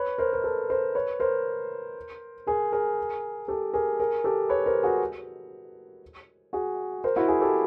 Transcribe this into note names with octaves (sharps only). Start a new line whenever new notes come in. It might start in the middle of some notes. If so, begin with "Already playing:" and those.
Already playing: B4 C#5
A#4 C5
A#4
A4 B4
A#4 C5
B4 C#5
A#4 C5
G#4 A#4
G#4 A#4
G4 A4
G#4 A#4
G#4 A#4
G4 A4
B4 C#5
A#4 C5
F#4 G#4
F#4 G#4
A#4 C5
E4 F#4
F#4 G#4
G4 A4